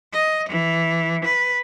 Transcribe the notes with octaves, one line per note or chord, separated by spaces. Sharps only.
D#5
E3
B4